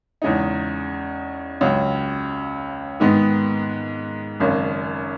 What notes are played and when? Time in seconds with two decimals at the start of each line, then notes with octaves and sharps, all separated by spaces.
0.22 E2 C#3 G#3 D#4
1.61 C#2 C#3 F#3 C#4
3.00 G#2 D#3 G#3 B3 D#4
4.40 G#1 F#2 C#3